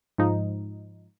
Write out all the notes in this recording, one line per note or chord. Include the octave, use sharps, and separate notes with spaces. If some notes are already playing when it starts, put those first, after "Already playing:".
G#2 F3 D#4